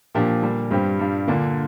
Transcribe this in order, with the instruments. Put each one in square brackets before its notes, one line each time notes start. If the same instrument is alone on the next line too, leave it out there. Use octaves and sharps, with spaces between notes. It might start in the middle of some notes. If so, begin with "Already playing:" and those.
[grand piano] A#2 [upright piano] F3 D4 G4
[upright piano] D3 G3 D4
[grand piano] G2 [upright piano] G3 C4 G4
[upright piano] G3 D4 F4
[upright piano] A#2 A#3 D4 [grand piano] D3